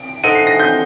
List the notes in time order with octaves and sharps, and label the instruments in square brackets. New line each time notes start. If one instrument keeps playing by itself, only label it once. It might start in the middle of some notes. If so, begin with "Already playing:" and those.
Already playing: [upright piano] D7
[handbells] D#4 A4 C5 D#5 F#5 [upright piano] D#7
[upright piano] C7
A#6
G6